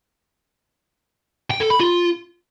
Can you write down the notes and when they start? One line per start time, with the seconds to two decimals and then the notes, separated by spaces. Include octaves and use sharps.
1.50 G5
1.60 A4
1.70 B5
1.80 F4